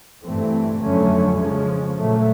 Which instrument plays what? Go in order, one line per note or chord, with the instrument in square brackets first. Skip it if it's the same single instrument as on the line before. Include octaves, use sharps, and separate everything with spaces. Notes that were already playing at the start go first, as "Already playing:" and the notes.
[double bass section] G2 E3 A3 C4
F2 D3 F#3 A3 C#4
C#3 F3 G#3 C#4
A#2 F#3 A3